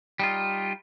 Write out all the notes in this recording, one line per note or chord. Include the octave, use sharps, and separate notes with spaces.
G3 D#4 F4